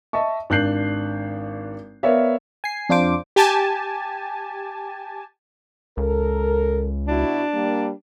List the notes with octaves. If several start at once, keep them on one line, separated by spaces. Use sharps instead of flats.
D#5 E5 A5 C#6
G#1 D4 F#6 G6 C7 F#7
B3 A#4 C#5 D5 E5 F5
G#5 C7
F2 D4 F4 C5 D6
G4 G#5 A5
C#2 A4 A#4
B2 D4 E4 F#4
G3 A#3